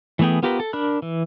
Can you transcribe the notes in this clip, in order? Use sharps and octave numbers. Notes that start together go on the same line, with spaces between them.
E3 A3 B3 G#4 G5
B3 F4 G4 A#4 B4
A4
D4 A#4 B5 F#6
E3